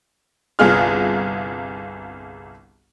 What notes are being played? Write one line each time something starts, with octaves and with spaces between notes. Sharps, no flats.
G1 C2 F4 G#4 F6